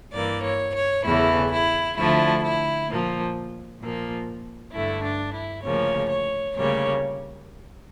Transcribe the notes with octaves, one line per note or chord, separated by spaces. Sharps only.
G2 E3 A#3 D5
C#5
C#5
E2 C#3 E3 A3 E4
E4
D2 D3 F3 A3 E4
E4
A#2 F3 A#3
A#2 F3 A#3
G2 D3 A3 E4
D4
E4
D2 C#3 F3 A#3 C#5
C#5
D2 C#3 G3 A#3 C#5